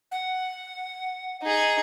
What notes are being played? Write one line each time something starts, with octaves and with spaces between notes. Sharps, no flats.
F#5
D#4 G#4